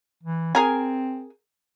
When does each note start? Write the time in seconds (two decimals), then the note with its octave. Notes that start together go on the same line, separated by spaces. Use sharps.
0.23 E3
0.55 C4 G#4 A#4 G#5